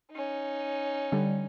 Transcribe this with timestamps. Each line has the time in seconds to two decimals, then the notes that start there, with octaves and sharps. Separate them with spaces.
0.12 C#4 D#4
1.12 D3 G3